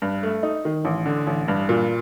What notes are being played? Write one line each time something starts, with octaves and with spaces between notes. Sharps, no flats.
G2
A3
D#4
D#3
A1
D3
A1
G2
A#2